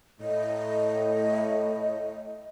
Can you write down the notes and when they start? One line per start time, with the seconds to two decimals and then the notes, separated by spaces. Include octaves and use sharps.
0.21 A2 D#5